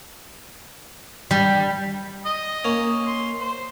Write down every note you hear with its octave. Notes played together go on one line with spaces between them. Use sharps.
G3
D#5
A#3 C#4
C6
C5